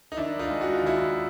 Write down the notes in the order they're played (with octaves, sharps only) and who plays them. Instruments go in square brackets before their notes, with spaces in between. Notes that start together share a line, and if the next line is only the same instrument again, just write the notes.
[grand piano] D#4
D#3 D4 E4
D#4 F4
G#3
F#4
F4
D#2 E4 F#4